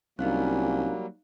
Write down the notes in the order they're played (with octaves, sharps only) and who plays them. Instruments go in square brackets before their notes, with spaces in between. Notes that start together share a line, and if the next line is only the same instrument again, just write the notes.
[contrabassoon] C2 [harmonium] F#3 G3 A#3 [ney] C#4 [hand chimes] D#4 F5 F#6